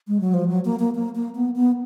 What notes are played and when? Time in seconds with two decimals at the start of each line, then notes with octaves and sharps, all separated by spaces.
0.08 G#3
0.20 F#3
0.34 F3
0.48 F#3
0.65 A#3
0.79 A#3
0.95 A#3
1.15 A#3
1.35 B3
1.56 B3